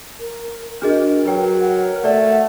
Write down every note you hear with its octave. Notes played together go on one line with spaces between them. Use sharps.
A#4
D4 F#4 G#4 A#4 D#5
F#3 B4 G5
F#5
A3 D5